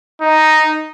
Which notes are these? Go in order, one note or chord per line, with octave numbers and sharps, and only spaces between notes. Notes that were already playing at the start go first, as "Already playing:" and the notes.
D#4